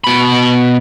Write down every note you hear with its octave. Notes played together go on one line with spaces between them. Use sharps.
B2 B5